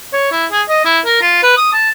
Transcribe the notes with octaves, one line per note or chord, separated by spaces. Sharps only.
C#5
E4
G#4
D#5
E4
A#4
F4
B4
D#6
A5